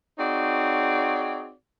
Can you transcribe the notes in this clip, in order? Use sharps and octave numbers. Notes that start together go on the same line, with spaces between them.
C4 D#4 F#4 G#4 C#5 D5